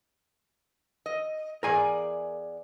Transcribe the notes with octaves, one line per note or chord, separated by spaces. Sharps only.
D#5
E2 G#4 A#4 D5 G#5